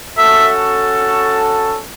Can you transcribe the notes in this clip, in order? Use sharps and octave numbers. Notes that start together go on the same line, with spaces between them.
C#4 F#4 A4 E5